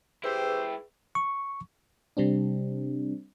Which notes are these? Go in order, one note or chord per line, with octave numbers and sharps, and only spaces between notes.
E4 G4 G#4 B4 C5 G5 E6
C#6
C3 G3 C4 D4